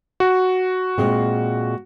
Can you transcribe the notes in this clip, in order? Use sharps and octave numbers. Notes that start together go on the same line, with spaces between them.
F#4
A#2 G#3 C4